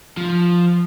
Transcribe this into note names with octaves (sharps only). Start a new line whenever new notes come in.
F3